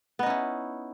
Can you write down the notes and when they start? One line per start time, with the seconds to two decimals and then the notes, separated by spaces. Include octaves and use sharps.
0.19 B3
0.23 D#4
0.26 C#4
0.30 E4